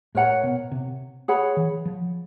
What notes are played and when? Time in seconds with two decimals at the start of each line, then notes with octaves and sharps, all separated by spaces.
0.15 A2 A#4 C#5 F#5 A#5
0.44 B2
0.72 C3
1.28 G#4 C#5 F#5 B5
1.57 E3
1.85 F3